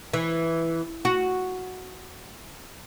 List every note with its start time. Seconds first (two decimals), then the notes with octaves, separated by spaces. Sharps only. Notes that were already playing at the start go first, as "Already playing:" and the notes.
0.13 E3
1.05 F#4